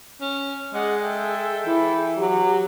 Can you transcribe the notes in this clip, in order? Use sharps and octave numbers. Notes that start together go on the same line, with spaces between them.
C#4
G#3 G#4 D5 D#5 F#5
A4 E5 G5
E3 E4
F#3 G4